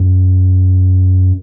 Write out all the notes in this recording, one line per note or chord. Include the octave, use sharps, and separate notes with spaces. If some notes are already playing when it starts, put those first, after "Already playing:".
Already playing: F#2